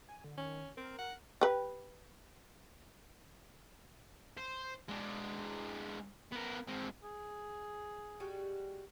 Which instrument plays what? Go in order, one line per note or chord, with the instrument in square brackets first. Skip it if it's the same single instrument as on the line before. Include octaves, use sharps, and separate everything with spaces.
[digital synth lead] G#5
D3
[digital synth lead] D#3 [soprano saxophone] C#4
[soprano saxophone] C4 [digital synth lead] A#4
[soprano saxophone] F#5
[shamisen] G4 B4
[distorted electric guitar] C5
G#3 D4
B3 A#4
G#3 C4
[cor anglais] G#4
[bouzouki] G3 G#3 F#4